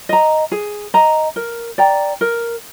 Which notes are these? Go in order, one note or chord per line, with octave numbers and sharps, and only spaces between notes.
D#5 A#5
G#4
D#5 A#5
A#4
D5 G5 A#5
A#4